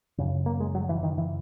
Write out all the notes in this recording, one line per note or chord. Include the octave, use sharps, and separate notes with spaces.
F#2 C#3
A#3
G#3
F#3
E3
D#3
E3